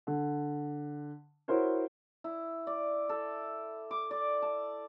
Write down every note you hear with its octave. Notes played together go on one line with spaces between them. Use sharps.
D3
E4 F#4 A#4 C5 C#5
E4
D5
A4
D6
D5
A5